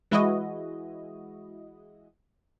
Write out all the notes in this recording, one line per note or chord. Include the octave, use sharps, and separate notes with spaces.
E3 G#3 E4 F#4 D#5